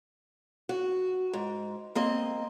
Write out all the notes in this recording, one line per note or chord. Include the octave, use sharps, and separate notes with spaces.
F#4
G#2
A#3 C4 D#5